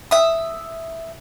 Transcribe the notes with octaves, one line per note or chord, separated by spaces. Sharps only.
E5 D#6